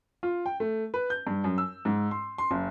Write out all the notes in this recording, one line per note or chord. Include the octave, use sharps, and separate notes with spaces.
F4
G5
A3
B4
G6
G2
F#2
E6
G#2
C6
C6
F#1